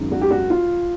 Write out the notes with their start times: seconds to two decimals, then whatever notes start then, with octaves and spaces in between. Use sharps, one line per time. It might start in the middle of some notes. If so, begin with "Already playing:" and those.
Already playing: G#1 F#2 D#3 G#3
0.12 F#4
0.21 G4
0.30 F#4
0.50 F4